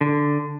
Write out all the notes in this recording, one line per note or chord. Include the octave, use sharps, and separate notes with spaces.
D3